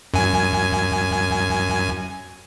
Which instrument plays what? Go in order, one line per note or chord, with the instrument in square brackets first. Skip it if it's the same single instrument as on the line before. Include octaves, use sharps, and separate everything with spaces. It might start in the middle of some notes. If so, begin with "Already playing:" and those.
[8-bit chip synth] F#2 G#5